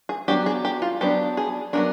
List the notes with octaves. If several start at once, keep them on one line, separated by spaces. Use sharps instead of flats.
G#4
F#3 B3 D4 G4
G#4
G4
F4
F#3 B3 D4 G4
G#4
F#3 B3 D4 A#4